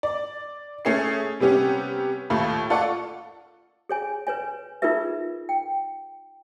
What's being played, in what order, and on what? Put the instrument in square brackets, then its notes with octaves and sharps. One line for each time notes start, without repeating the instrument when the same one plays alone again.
[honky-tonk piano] D5
A3 C#4 G#4 C7
C3 G3 B3 C#4 G4
D#2 A2 A3 F4 B5
F4 A4 D5 F#5 C#6
[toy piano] G#4 C#5 G#5
B4 C#5 G#5
D#4 F4 G#4 A#4 B4 E5
G5